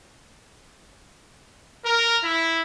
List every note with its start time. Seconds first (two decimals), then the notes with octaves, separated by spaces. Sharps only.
1.85 A#4
2.24 E4